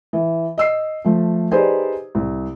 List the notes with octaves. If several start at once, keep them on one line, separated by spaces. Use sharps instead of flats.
E3
D#5 E6 C7
F3 A3
D#4 G4 G#4 B4 C5 D5
C2